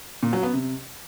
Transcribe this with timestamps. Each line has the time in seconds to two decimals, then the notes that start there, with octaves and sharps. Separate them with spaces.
0.23 A#2
0.33 F#3
0.43 B3
0.53 C3